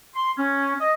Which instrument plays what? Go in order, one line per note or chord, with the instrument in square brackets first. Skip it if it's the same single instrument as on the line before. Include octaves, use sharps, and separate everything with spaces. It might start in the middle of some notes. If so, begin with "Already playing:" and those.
[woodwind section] C6
C#4
D#5